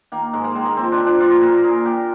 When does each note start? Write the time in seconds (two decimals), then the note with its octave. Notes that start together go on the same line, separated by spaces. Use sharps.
0.12 D#3 A#3
0.33 G#2 G#3
0.44 A#3
0.55 D#3 G#3
0.66 A#3
0.77 F3 C4
0.92 D4
0.99 F3
1.06 D4
1.20 A#2 F4
1.31 A#4
1.41 A#2 A#4
1.53 A#4
1.63 A#2 G#4
1.85 A#2 G4